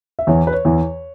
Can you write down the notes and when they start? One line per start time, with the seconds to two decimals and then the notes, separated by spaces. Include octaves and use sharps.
0.19 E5
0.27 E2 E3 C#5
0.47 B4
0.53 C#5
0.65 E2 E3